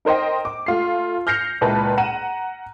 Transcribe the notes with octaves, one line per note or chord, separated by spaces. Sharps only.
D#4 A#4 C5 D#5 G5
D6
A3 F4 C7
F6 G6 A#6 C7 C#7 F7
C#2 A#2 E4 B4 A5
F#5 A#5 D#7 E7